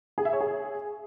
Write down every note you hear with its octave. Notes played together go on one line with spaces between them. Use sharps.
G#4
E5
C#5
G#4